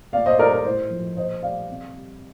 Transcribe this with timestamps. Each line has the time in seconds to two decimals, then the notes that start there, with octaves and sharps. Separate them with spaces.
0.12 A#2 D5 F5
0.26 C5 D#5
0.39 G3 A#4 D5
0.52 A#4
0.65 A2 C5
0.90 F3
1.17 A#2 C5 D#5
1.43 G3 D5 F5
1.69 C3
1.94 G3